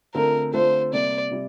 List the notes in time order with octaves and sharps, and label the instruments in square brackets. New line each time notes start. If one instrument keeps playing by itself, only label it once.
[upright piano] D3 A3 C4 F4 A4 [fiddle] A#4
[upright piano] D3 A3 C4 F4 A4 [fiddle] C5
[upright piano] C3 G3 A#3 [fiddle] D5
[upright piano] C3 G3